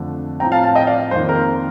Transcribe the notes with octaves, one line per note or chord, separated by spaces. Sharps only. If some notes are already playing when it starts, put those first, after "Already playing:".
Already playing: F2 D3 A3
A2 F3 C4 G5 A#5
F5 A5
F5 A5
D#5 G5
D5 F5
F2 D#3 A#3 C5
A#4